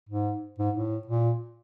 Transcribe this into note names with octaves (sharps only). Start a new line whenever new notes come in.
G#2
G#2
A2
A#2